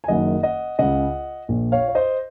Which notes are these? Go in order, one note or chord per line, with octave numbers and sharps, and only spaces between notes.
G#5
F#1 F#2 D#3 D#5 F#5
D#5 F#5
C#2 C#3 D#5 F#5
A#1 A#2
C#5 F5
C#5
C5 D#5